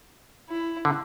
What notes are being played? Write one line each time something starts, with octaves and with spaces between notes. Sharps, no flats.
E4
D3